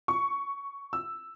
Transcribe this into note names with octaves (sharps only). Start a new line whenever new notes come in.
C#6
E6